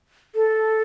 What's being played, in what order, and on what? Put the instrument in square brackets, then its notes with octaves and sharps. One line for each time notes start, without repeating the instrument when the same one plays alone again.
[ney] A4